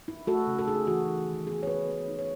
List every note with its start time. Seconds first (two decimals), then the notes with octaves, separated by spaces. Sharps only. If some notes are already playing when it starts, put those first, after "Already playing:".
0.08 E4
0.27 A3 F#4 A4
0.47 C#3
0.59 A4
0.68 D#4 G#4
0.87 E3 F#4
1.07 D#4
1.27 D#3
1.47 B3 G#4
1.63 C#5
1.67 E4 G#4 B4
1.87 B3
2.08 D#4
2.19 C#5